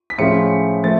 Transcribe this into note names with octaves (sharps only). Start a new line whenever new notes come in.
B6
A2 F3 G#3 C#4 F4 C#7
F3 A3 A6